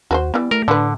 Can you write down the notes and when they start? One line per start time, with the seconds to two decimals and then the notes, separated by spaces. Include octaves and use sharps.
0.11 D#2 F#4 B4 C5
0.34 E3 G3 B3
0.51 A3 A#4
0.68 A2 D3 D4 B4